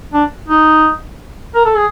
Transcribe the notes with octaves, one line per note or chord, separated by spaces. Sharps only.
D4
D#4
A#4
A4
G#4